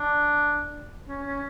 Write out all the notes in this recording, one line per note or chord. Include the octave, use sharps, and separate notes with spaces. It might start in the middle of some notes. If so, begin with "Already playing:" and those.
Already playing: D4
C#4
C#4